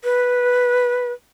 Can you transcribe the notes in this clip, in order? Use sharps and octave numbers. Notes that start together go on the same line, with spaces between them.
B4